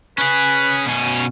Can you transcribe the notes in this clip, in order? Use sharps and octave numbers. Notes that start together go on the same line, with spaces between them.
C#4 G#4 B4
B2 C#4